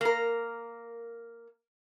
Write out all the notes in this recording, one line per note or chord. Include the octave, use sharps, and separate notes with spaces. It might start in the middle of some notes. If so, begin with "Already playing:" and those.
A#3 A#4